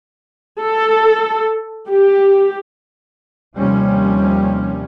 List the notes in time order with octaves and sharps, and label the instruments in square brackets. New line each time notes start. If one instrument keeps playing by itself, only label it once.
[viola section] A4
G4
[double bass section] D#2 C3 F3 G3 C#4